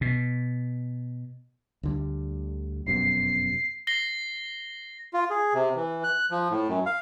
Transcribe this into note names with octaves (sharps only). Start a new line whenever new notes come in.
B2
D2 D3 G3
F1 F#2 B2 C7
A#6 C7 G7
F4
G#4
C3
E3
F#6
F3
A2
F#2
F5